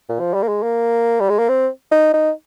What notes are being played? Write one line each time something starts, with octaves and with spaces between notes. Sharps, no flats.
A#2
F3
G3
A#3
G#3
A#3
G3
G#3
A#3
C4
D#4
D#4